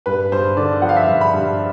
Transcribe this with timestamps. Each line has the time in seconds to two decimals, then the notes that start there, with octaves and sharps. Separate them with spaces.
0.06 G2 B4
0.32 G2 C5
0.56 D3 D5
0.82 F3 F#5
0.89 F5
0.96 E5
1.03 G2 F5
1.21 B5
1.33 G2